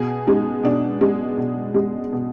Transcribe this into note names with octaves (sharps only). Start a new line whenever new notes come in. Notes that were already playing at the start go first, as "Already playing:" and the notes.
Already playing: B2 G#4
G#3 D#4
B2 D4
G#3
B2
G#3
B2